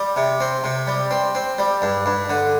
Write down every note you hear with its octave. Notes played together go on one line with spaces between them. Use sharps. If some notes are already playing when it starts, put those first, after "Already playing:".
Already playing: G3
C3
C4
C3
G3
C4
C4
G3
G2
G2
D3